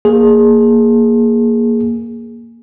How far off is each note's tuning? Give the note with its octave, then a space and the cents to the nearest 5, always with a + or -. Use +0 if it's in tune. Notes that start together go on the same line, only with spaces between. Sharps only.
A#3 +0 G#4 +0